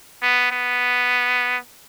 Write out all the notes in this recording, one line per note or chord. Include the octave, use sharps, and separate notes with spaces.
B3
B3